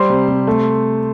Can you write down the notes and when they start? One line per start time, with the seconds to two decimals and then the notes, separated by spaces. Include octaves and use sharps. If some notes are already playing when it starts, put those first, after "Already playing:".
Already playing: G3 C5 C6
0.10 C3
0.28 C3
0.47 A3